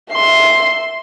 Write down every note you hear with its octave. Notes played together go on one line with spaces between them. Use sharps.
E5 C6